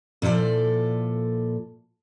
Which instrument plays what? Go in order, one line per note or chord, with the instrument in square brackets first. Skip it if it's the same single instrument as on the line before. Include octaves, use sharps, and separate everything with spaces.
[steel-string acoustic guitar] A#2 F3 E4 A4 D5